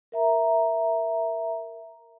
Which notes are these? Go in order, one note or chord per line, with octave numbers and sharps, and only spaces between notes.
A#4 E5 A#5